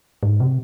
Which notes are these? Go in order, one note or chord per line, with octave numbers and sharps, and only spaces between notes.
G#2
C3